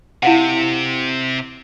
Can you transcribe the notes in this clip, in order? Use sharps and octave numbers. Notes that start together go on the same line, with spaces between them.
C3 E4 F5 F#5